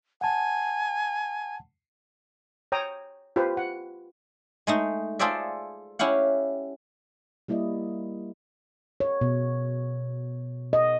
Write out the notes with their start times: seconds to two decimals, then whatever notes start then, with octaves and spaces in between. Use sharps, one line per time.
0.21 F#5 G#5 A5
2.72 C#5 G5 A#5 D#6
3.36 F4 G4 B4 C5
3.57 F#5
4.67 G#3 A3 D#4
5.19 F4 G#4 A4 C5 D5 E5
5.99 C#4 E4 G4 F5 F#5
7.48 G3 A#3 E4 D5 D#5
9.00 C#5
9.21 B2
10.73 D#5